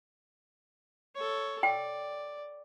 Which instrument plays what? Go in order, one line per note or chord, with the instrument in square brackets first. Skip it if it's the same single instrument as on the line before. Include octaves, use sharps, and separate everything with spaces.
[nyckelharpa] A4 C#5
[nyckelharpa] D5 [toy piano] G5